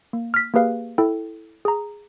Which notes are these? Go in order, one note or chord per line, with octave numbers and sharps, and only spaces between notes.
A#3
F6 B6
A#3 G4 G#4 B4 F5
E4 A4 G5
G#4 A#5